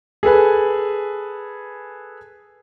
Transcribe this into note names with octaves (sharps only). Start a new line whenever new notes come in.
G#4 A4 B4 G#5